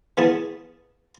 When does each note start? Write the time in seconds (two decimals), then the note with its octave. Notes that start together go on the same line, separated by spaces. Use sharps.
0.17 E3 B3 G#4 A5